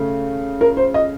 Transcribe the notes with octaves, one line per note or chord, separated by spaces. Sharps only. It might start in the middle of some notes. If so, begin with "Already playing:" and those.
Already playing: C#3 A3
A#4
C5
D#5